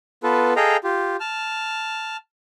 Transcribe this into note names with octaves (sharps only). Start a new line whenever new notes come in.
B3 F4 A4 B4
G#4 A4 D#5 F5 G5 A#5
F4 G4
A5 F6